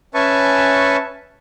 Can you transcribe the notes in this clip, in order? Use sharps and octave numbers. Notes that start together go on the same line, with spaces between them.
C#4 B4 E5 G#5 A5 C#6